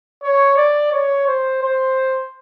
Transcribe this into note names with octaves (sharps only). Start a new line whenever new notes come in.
C#5
D5
C#5
C5
C5